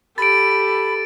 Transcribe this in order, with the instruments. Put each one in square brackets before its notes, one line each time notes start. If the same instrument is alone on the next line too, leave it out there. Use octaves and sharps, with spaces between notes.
[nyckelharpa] G4 A4 [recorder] B5 [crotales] A6 D7